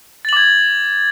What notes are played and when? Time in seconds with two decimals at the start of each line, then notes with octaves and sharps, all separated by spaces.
0.25 A6
0.29 F#7
0.33 D6
0.37 G#6